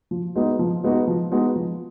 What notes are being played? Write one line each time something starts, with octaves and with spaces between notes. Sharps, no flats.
F3
G#3 B3 D#4 F#4
F3
G#3 B3 D#4 F#4
F3
G#3 B3 D#4 F#4
F3